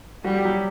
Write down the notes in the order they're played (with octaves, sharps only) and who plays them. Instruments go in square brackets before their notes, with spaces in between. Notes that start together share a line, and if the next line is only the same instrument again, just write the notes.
[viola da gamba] G3 [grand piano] F#4
[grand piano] G4
F#3 F#4